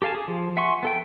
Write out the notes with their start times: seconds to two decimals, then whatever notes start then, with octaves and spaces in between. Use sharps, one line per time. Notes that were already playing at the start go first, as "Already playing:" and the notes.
0.02 G4 A4 F5 G#5 A5
0.15 G#4
0.28 F3
0.57 E5 F#5 G#5 C6 C#6
0.83 B3 A4 G5